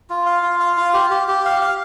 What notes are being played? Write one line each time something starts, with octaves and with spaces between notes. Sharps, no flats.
F4
F5
F4
F5
F4
G4
G4
G4
F5
F5